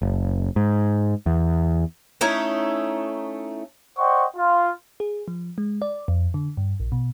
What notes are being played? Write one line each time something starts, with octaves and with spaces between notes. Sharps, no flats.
F#1
G#2
E2
A3 C#4 D#4 E4
C5 D5 D#5 F#5 G5 C#6
F4
G#4
F3
G#3
D5
F2
D3
G2
A#1
B2